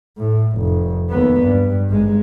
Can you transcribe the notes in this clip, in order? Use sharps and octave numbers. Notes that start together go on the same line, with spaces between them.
A2
F1
D#2 B3
G2
G#1 G#3